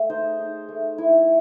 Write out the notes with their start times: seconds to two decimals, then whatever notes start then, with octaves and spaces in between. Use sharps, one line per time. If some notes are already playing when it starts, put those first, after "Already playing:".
Already playing: A3 G#4
0.10 D#4 C5
0.39 D#4
0.69 A3
0.98 E4